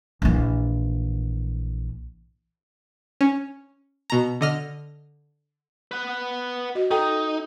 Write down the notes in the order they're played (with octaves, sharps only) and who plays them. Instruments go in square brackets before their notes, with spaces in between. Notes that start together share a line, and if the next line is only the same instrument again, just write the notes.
[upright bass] A#1 E3
[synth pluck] C#4
B2 A#5
D3 D#5 F6
[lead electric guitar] B4 F#5
[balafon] F#4 D#5
[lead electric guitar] D#4 [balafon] A4 G5 A#5